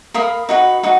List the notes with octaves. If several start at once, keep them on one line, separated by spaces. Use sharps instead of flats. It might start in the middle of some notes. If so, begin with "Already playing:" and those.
A#4 F5 B5 D#6
D#4 F#4 B4
D#4 F#4